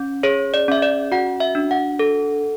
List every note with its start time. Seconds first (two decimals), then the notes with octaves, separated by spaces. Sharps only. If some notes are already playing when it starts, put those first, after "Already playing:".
Already playing: C#4
0.23 G#4 C#5
0.54 D5
0.68 C#4 E5
0.82 D5
1.12 F#4 F#5
1.40 E5
1.55 D4
1.71 F#5
1.99 A4